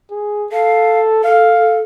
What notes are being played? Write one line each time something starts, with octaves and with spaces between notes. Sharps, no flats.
G#4
A4 F5
A4 F5